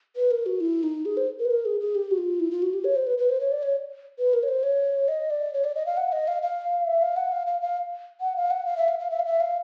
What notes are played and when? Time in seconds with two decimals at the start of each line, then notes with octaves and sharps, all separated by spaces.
0.16 B4
0.31 A#4
0.46 F#4
0.61 E4
0.83 D#4
1.05 G#4
1.17 C5
1.39 A#4
1.45 B4
1.51 A#4
1.65 G#4
1.80 G#4
1.95 G4
2.11 F#4
2.18 F4
2.40 E4
2.51 F4
2.62 F#4
2.74 G4
2.84 C#5
2.96 C5
3.07 B4
3.18 B4
3.29 C5
3.40 C#5
3.52 D5
3.63 C#5
4.19 B4
4.34 A#4
4.43 C#5
4.48 C5
4.63 C#5
5.08 D#5
5.30 D5
5.53 C#5
5.64 D5
5.75 D#5
5.86 F5
5.97 F#5
6.12 D#5
6.28 F5
6.42 F5
6.87 E5
7.02 F5
7.17 F#5
7.32 F5
7.47 F5
7.61 F5
8.21 F#5
8.36 F5
8.51 F#5
8.66 F5
8.77 E5
8.89 F5
8.99 F5
9.11 E5
9.19 F5
9.25 E5
9.40 F5